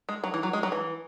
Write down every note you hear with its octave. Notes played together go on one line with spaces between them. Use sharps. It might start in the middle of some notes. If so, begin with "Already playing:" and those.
G#3
F#3
E3
F#3
G#3
F#3
E3